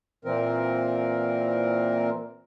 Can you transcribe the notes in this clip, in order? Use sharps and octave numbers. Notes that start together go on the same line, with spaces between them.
A#2 E3 C4 A#4